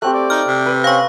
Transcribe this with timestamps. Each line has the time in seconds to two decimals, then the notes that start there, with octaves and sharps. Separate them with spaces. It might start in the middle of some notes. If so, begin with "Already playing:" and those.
0.02 A3 C4 G4 F#6
0.14 D5
0.30 D#4 F6
0.47 C3
0.66 B4
0.84 C4 C#4 F5 C#6